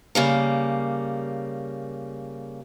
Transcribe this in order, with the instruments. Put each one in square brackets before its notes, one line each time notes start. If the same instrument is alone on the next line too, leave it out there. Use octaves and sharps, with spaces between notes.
[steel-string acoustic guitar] C#3 G3 A#3